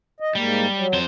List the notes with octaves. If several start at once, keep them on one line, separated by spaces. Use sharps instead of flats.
D#5
G#2 G3 A#3
F#3
F2 C5